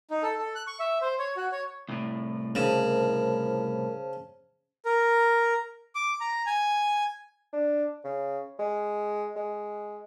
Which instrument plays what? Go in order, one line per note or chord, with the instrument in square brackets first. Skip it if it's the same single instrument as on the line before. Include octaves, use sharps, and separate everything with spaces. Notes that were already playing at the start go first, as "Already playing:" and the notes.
[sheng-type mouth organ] D#4
A4
A4
F#6
C#6
E5
C5
C#5
F#4
C#5
[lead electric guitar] C2 A2
[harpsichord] C#3 [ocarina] A#4 [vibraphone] C5 A5
[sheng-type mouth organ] A#4
D6
A#5
G#5
[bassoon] D4
C#3
G#3
G#3